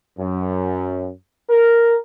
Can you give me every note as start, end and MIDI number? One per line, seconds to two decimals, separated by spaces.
0.19 1.11 42
1.50 1.96 70